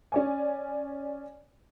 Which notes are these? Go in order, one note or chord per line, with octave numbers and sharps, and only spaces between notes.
C#4 D5 G#5